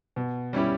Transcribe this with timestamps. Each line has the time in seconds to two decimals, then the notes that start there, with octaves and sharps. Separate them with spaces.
0.16 B2
0.53 G3 C#4 E4 G4